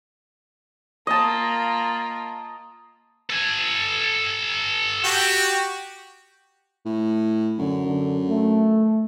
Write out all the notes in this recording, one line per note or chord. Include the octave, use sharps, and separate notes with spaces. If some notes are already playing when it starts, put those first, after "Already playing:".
A#3 F4 D#5 A5
A4 G#5
F#4 G4 G5
A2
F#2 D3
D3
A3